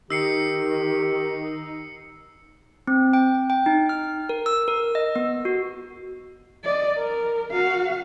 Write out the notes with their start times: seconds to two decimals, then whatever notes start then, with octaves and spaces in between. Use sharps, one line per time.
0.10 D#3 D#4 G4 E6 C7 C#7
2.87 C4
3.13 G5
3.50 G5
3.66 D#4
3.89 F6
4.29 A#4
4.46 E6
4.68 A#4
4.95 D#5
5.16 B3
5.45 F#4
6.64 D5 D#5
6.98 A#4
7.52 F#4 F5